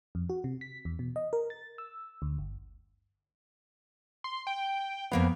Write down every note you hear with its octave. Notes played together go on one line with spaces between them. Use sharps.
F2
F#4
C3
B6
E2
B2
D#5
A#4
A6
E6
D2
G1
C6
G5
F2 A#3 B3 F5